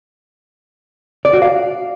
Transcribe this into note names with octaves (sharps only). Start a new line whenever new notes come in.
D5
F#4
F5